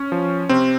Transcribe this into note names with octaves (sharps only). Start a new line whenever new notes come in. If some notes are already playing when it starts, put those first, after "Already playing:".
Already playing: C#4
F3
C3 C4